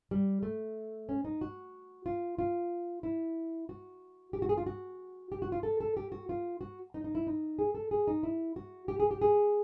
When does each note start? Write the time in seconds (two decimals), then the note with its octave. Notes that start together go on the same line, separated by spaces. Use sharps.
0.11 G3
0.43 A3
1.09 C#4
1.25 D#4
1.41 F#4
2.06 F4
2.39 F4
3.03 E4
3.69 F#4
4.33 G4
4.42 F#4
4.49 G#4
4.57 F4
4.66 F#4
5.32 G4
5.42 F#4
5.52 F4
5.63 A4
5.80 A4
5.97 G4
6.12 F#4
6.29 F4
6.61 F#4
6.94 D#4
7.04 D#4
7.15 E4
7.27 D#4
7.59 G#4
7.75 A4
7.91 G#4
8.08 D#4
8.23 E4
8.56 F#4
8.88 G4
9.00 G#4
9.11 G4
9.22 G#4